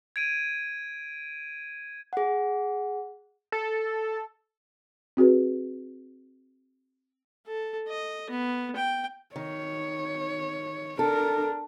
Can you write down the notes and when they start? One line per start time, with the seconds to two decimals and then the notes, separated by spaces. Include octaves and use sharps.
0.16 G#6 D7 D#7
2.13 G#4 F#5
3.52 A4
5.17 C4 F#4 G#4 B4
7.47 A4
7.89 D#5
8.30 B3
8.76 G5
9.36 D#3 C#5
10.99 D4 A4 A#4